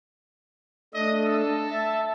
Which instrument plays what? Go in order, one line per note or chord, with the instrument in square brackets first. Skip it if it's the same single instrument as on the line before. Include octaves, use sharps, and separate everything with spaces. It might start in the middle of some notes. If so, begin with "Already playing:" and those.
[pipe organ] A3 D4 [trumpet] D#5
[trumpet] A4
[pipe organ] E5 A5